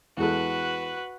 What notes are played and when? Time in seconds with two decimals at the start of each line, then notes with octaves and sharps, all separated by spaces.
0.17 E2 G#3 F#4 A4 B4